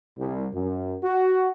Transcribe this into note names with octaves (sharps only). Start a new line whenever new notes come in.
C2
F#2
F#4